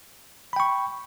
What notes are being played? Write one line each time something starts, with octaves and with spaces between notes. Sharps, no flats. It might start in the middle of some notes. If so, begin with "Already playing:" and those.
G5 B5 C#6